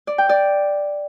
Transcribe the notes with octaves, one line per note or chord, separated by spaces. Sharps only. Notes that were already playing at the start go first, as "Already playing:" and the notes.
D5
G5
D5